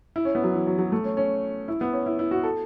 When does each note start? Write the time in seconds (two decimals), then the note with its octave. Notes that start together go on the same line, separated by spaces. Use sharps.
0.16 E4
0.25 C#4
0.35 B3
0.44 F#3
0.54 E3
0.67 F#3
0.79 F#3
0.92 A3
1.04 C#4
1.17 C#4
1.68 E4
1.81 B3
1.93 C#4
2.06 E4
2.19 E4
2.31 F#4
2.43 A4